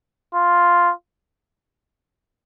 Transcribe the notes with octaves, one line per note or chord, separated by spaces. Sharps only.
F4